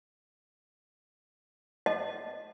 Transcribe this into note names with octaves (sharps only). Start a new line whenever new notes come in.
D#5